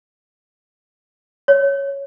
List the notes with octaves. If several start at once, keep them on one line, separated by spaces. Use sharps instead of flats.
C#5